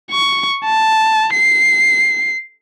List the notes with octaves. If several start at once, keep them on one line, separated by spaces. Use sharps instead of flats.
C#6
A5
C7